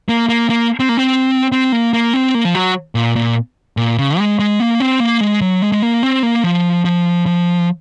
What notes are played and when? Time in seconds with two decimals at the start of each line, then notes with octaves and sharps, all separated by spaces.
0.09 A#3
0.29 A#3
0.50 A#3
0.80 C4
0.89 A#3
0.97 C4
1.52 C4
1.72 A#3
1.93 A#3
2.14 C4
2.34 A#3
2.45 F3
2.55 F#3
2.95 A#2
3.16 A#2
3.77 A#2
3.98 C#3
4.18 G#3
4.39 G#3
4.60 A#3
4.80 C4
5.00 A#3
5.21 G#3
5.41 F#3
5.62 G#3
5.72 G#3
5.82 A#3
6.03 C4
6.23 A#3
6.43 F3
6.85 F3
7.26 F3